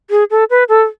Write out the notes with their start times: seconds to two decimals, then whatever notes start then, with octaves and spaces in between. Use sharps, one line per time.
0.11 G#4
0.31 A4
0.50 B4
0.69 A4